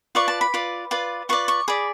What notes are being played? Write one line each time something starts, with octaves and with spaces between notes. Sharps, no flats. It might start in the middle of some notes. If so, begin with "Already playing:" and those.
F4 B4 D5 C#6
A5
B5
F4 B4 D5
F4 B4 D5
F4 B4 D5 C#6
C#6
G#4 D5 B5